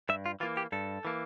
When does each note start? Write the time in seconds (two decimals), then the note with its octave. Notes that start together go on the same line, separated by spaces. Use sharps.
0.09 G2 E5
0.26 F4
0.40 E3 A#3 F4
0.57 G4
0.72 G2 A4
1.05 E3 A#3